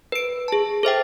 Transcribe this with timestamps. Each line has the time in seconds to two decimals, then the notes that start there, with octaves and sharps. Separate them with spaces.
0.12 B4 D7
0.48 G#4 A5
0.83 A4 C5 E5 G5